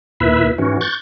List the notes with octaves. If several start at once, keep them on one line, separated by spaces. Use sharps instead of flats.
D#2 A#2 E4 B4 E5
G#2 E3 C#4 F#4
C#6 F#6 G6 A6